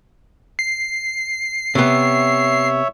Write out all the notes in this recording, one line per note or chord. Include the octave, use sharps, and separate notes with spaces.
C7
C3 B3 C#5 E5